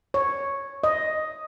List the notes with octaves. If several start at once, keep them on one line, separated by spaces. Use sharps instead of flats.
C#5
D#5